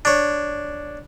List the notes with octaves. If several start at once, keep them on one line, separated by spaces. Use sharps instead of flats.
D4 C#5